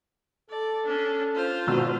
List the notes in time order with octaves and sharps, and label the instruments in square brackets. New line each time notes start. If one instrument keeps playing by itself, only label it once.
[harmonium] A4 [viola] D5
[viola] C#4 D4
F4 C5
[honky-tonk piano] G#1 B2 E6